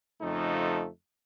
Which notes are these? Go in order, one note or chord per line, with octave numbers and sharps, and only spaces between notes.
F2 C#3 F3 A3 D#4